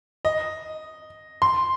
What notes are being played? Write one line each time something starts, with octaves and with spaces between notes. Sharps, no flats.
D#5
C6